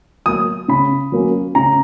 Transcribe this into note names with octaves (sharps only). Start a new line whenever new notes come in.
F#3 A#3 D#6
C#3 B5
F#3 A#3 C#4
C#3 A#5